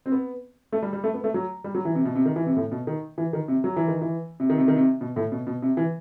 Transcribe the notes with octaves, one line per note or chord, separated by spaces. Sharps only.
C4
B3
A3
G3
G3
A3
B3
A3
F#3
G3
F#3
E3
C3
B2
C3
D#3
E3
C3
A2
B2
D#3
E3
D#3
C3
F#3
E3
D#3
E3
C3
D#3
C3
D#3
C3
B2
A2
B2
B2
C3
E3